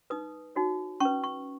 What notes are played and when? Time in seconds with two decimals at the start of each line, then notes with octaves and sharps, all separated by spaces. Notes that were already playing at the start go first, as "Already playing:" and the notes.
0.10 D#4 B4 D#6
0.56 D#4 F#4 C#5
1.00 C#4 B4 C#6
1.24 C#6